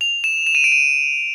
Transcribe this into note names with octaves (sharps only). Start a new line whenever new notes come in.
F7
E7
E7
D#7
D7
D#7